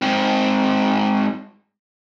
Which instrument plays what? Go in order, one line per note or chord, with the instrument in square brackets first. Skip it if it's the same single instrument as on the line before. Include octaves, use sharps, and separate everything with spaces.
[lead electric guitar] G#2 C4